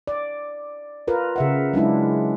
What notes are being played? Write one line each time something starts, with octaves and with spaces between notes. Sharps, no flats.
D5
F4 A#4 B4
C#3 E5 F#5
F#3 G#3 D4 E4